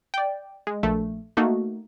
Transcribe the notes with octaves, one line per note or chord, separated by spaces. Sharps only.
D5 G5
G#3
A#1 A3
A3 A#3 D#4 F#4